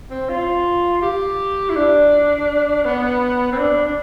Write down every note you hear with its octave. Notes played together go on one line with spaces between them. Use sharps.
C4
F4
G4
E4
D4
B3
C4
D4
D4